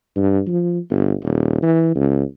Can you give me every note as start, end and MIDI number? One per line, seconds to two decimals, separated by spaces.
0.16 0.41 43
0.47 0.79 53
0.90 1.14 31
1.23 1.61 27
1.62 1.95 52
1.95 2.23 37